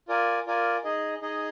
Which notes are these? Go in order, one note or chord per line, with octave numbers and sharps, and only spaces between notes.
F4 A#4 D5 G#5
F4 A#4 D5 G#5
D#4 G#4 D#5
D#4 G#4 D#5